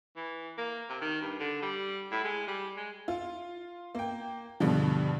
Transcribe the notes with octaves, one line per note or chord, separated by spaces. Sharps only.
E3
A#3
C3
D#3
G2
D3
G3
A2
G#3
G3
G#3
F4
A#3 G5
G2 B2 D3 F3